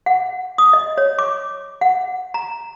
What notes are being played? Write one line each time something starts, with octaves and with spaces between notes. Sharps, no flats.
F#5
D#6
D#5
C#5
D6
F#5
A#5